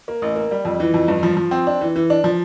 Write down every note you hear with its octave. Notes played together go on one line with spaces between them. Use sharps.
A#3
A1
A#3
G3
F2
E3
F2
G2
F3
F3
C4
D4
E3
E3
D4
F3